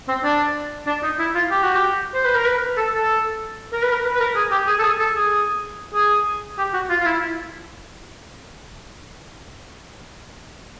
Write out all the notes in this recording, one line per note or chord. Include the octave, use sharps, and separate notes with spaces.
C4
D4
D4
D#4
E4
F4
G4
F#4
G4
C5
B4
A#4
B4
A4
A4
A#4
B4
A#4
B4
B4
A#4
G#4
G4
G#4
A4
G#4
A4
G#4
G#4
G4
F#4
F4
F4
E4